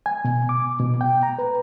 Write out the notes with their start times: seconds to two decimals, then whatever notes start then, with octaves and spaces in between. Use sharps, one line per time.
0.06 G#5
0.25 B2
0.49 D6
0.80 B2
1.01 G5
1.23 A#5
1.39 B4